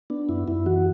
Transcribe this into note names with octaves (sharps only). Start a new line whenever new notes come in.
B3 D4
F#2 E4
F#2 E4
E3 F#4